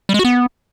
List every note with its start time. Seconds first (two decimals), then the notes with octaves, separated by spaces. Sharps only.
0.09 G3
0.14 G#3
0.19 F#4
0.25 B3